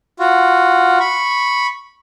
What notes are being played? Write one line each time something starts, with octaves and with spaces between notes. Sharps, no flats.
F4 F#4
B5 C#6